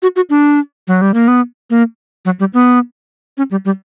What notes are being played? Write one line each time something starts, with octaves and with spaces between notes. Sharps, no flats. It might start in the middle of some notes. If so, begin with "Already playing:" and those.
F#4
F#4
D4
F#3
G3
A#3
B3
A#3
F#3
G3
B3
C#4
G3
G3